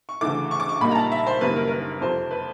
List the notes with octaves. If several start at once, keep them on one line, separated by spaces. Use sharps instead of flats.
C#6
D2 C#3 E3 A3 D6
C#6
D6
C#6
A#1 A#2 G3 A#3 D#4 B5
A#5
A5
E5
C5
F#1 F#2 D#3 G3 A#3 B4
A#4
A#4
B4
F2 C3 F3 C5
B4